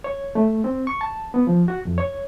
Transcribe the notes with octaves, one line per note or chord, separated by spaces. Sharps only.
C#5
A3
C4
C#6
A5
B3
F3
F#4
F2
C#5